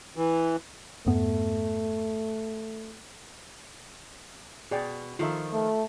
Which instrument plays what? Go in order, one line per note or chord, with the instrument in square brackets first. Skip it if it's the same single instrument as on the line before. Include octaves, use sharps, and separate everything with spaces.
[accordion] E3
[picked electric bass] F2 G#2 B3 [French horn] A3
[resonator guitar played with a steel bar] B2 [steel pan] G#4 D5 G5
[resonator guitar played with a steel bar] D#3 F3 [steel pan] F4 A4 E5
[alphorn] A3